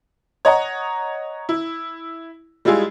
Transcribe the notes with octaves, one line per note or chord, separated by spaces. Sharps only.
C#5 D#5 F#5 A#5
E4
G3 G#3 E4 F4 G#4